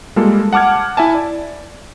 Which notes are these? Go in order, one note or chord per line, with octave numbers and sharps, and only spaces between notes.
G3 G#3 A#3 F4 A4
F#5 A5 D6 F6 G#6
E4 E5 G#5 A5
D5